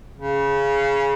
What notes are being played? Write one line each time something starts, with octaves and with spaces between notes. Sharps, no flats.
C#3